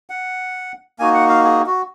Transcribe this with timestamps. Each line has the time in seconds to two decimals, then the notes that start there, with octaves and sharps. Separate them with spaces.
0.10 F#5
0.99 A#3 D#4 F#4 G#5
1.14 F#5
1.29 F5
1.44 G#4
1.66 F#4